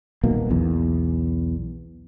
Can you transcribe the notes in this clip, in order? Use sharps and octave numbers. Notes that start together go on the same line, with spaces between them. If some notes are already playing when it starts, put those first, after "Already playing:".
D#1 B1 B2 A#3
B1 E2